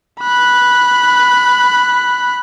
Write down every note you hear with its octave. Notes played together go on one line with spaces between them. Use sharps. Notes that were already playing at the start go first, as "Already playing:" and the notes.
B5 F#6